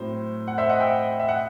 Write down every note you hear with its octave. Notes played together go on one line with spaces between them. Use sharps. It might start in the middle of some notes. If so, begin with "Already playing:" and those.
Already playing: A2 F#3 C4 C5
F#5
C5 E5
D#5 F#5
E5 G5
E5
F#5